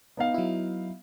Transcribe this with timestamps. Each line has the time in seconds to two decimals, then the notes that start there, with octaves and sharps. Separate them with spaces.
0.17 B3 D#4 F5
0.34 F#3 E4